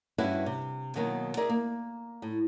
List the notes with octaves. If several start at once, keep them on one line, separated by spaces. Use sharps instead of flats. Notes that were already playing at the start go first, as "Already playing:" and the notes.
G2 C#4 E4 F#4 B4 E5
C3
B2 D#3 F#3 A#3
D#4 G#4 A#4 D5 E5
A#3
A2